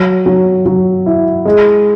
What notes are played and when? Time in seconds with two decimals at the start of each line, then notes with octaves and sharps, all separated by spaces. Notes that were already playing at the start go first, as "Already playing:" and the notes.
Already playing: F#3
0.26 F#3
0.66 F#3
1.06 E4
1.46 G#3